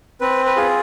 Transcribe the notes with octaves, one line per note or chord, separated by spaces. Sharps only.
C4 B4
B4
F4 G#4